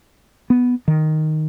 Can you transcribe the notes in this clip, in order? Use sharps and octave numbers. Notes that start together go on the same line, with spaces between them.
B3
D#3